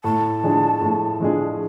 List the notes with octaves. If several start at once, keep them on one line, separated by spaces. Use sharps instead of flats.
A2 A5
F3 G#3 D4 G#4
A2
F3 G#3 D4 G#4